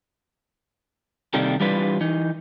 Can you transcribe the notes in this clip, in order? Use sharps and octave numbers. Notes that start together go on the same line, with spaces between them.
C3 D#3 G3 A#3 A4
E3 G3 D4 F4 B4
E3 D#4